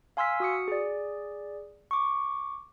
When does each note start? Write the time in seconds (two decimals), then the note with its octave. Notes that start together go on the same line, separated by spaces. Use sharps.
0.17 F5 G#5 C6 E6 F6 B6
0.40 F#4 D#6 C#7
0.68 G#4 D5
1.91 C#6 D6